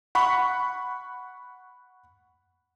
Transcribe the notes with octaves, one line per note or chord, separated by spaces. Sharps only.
F#5 B5 C#6